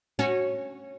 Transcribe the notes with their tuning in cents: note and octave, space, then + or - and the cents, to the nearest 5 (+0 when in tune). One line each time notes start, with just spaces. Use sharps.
C#4 -20 F#4 +5